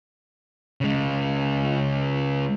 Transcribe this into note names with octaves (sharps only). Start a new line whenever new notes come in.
C#3 G#3